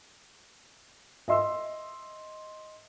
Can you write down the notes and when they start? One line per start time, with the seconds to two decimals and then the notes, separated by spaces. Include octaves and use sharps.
1.28 D#5 E5 C6 E6